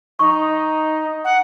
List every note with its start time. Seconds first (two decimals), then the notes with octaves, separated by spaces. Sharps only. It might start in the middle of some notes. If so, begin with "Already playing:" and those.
0.19 D#4 C#6
1.24 F#5